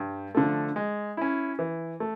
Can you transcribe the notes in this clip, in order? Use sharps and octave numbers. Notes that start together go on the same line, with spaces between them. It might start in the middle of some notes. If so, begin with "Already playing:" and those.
Already playing: G2
D3 F3 A3
G#3
C#4 E4
E3
A3